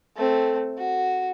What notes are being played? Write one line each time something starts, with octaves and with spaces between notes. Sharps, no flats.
A3 C4
F#4